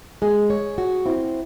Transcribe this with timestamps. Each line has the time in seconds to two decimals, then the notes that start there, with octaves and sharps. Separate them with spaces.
0.22 G#3 G#4
0.50 C#5
0.78 F#4
1.05 C4 E4